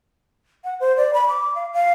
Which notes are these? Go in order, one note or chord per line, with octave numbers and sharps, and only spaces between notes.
F#5
C5
D5
B5
D6
F5
F5